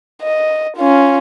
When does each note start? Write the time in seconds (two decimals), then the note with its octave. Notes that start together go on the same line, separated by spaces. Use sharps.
0.22 D#5
0.77 C#4 F4